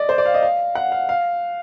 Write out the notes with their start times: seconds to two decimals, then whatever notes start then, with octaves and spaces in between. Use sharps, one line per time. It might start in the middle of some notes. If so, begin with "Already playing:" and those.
Already playing: D5 D#5
0.09 C5
0.18 D5
0.25 F5
0.34 D#5
0.43 F5
0.75 F#5
0.92 F5
1.09 F5